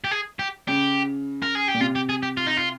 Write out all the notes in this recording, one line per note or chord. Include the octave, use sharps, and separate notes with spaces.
G4
G#4
G4
C#3 G4
A#4
G#4
G4
A#2
C3 F4
G4
G#4
G4
F4
D#4
F4